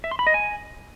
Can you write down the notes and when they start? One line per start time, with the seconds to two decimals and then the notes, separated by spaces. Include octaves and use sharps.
0.04 E5
0.11 C6
0.19 B5
0.27 D#5
0.34 G#5